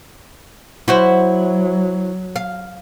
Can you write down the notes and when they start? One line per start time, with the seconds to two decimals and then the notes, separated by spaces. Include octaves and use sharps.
0.88 F#3 E4 F#4 C5
2.36 F5